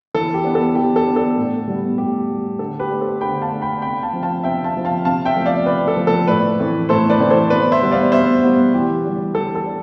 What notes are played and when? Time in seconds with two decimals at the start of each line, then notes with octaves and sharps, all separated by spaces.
0.14 E3 A4
0.34 G4
0.45 B3 D4
0.55 A4
0.75 E3 G4
0.96 A4
1.06 B3 D4
1.16 A4
1.37 A2
1.68 G3 B3
1.98 A2 G4
2.28 G3 B3
2.59 D3 A4
2.80 G4 B4
2.90 A3 D4
3.00 A4 C5
3.21 D3 G5 B5
3.41 F5 A5
3.52 A3 D4
3.62 G5 B5
3.82 C3 G5 B5
4.03 F5 A5
4.13 F3 C4
4.23 F5 A5
4.43 C3 E5 G5
4.64 F5 A5
4.74 F3 C4
4.85 F5 A5
5.05 C3 F5 A5
5.25 E5 G5
5.36 F3 A3
5.46 D5 F5
5.66 C3 B4 D5
5.88 A4
5.97 F3 A3
6.07 A4
6.28 A2 B4 D5
6.59 E3 A3 C4
6.89 A2 A4 C5
7.10 B4 D5
7.20 E3 A3 C4
7.30 A4 C5
7.50 B2 B4 D5
7.72 C5 E5
7.82 G3 B3
7.91 D5 F5
8.12 B2 C5 E5
8.43 G3 B3
8.74 E3 G4
9.05 G3 D4
9.35 E3 A4
9.55 A4
9.66 D4